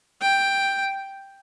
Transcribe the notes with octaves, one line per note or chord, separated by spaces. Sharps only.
G5